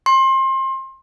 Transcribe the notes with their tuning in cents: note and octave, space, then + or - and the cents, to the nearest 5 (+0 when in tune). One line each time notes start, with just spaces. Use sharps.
C6 +30